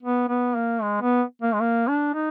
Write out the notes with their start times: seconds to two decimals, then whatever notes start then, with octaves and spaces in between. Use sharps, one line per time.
0.02 B3
0.29 B3
0.56 A#3
0.82 G#3
1.01 B3
1.42 A#3
1.54 G#3
1.61 A#3
1.88 D4
2.14 D#4